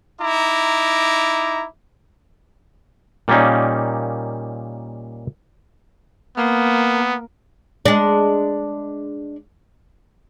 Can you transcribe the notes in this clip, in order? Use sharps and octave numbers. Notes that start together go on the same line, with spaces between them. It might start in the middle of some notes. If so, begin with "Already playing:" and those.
D#4 E4 A#5 D6
A#2 G3 A#3 C#4 D#4
A#3 B3
G#3 D4